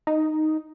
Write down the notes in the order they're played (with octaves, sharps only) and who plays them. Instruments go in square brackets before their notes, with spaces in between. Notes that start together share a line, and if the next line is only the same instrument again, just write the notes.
[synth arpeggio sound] D#4